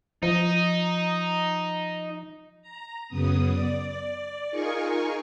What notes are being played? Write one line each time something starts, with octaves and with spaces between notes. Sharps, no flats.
F3 D#4
A#5
F#2 C#3 B3 D#6
D5
D#4 F4 G#4 A#4 G#5 C#6